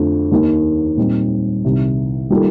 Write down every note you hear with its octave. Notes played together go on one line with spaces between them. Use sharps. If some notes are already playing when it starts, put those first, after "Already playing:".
Already playing: F2 D3 F3 A3
D#2 D#3 A#3
A#2 G3 C4 D#4
C2 C3 D#3
D#3 G3 A#3 F4 A4